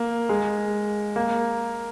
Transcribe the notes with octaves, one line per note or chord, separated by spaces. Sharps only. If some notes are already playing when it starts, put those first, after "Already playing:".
Already playing: A#3
G#3
A#3